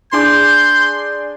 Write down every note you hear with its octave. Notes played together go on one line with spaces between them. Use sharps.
D4 G#4 C6 D6 G6